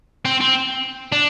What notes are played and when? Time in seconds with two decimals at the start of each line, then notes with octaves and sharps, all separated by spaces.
0.25 C4
0.40 C4
1.12 D4